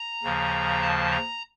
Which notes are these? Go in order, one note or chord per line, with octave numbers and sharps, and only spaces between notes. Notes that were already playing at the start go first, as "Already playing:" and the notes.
Already playing: A#5
D#2 C#3 F3
A5
A#5